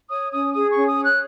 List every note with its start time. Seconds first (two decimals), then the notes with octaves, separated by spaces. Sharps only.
0.09 C#5 D#6
0.31 C#4 D#6
0.54 G#4 D#6
0.70 C#6
0.75 C#4
0.86 D#6
0.98 C#5 F#6